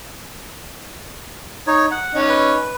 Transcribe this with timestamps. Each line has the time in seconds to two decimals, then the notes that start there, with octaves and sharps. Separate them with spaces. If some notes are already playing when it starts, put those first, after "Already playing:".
1.67 D#4 C#5
1.91 F#5
2.15 C#4 D#4
2.29 B4